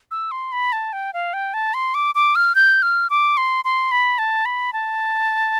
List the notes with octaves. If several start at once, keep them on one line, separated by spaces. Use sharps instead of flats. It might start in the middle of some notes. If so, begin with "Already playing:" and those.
E6
C6
B5
A5
G5
F5
G5
A5
C6
D6
D6
F6
G6
F6
D6
C6
C6
B5
A5
B5
A5